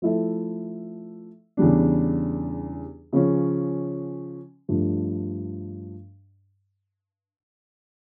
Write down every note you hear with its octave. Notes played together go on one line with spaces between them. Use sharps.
F3 A3 E4 A4 E5
E2 C#3 G3 D4
C#3 F3 C#4
G2 F3 A3 D4